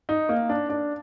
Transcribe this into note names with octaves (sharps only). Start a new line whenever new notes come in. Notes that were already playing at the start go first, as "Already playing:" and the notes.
D#4
A#3
D4
D4